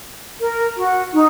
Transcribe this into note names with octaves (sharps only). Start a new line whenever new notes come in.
A#4
F#4
D#4